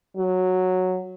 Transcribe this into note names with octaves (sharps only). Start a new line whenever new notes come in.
F#3